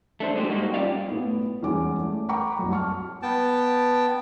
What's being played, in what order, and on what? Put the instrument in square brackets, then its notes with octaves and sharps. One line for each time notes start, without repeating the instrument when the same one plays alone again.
[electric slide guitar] A3 D4 C5
G#3 D4 F#4 G4 C5
G2 A#3 D#4 F#4 G4
G3 C#4 F4 G4 D5 F5
[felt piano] A2 B3
E2 E3 G3 G#3 C#4 D6
A3
F#5 G5 A#5 B5 C#6 D6
C2 F#2
A5 C#6 F6
[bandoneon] B3 G5 A5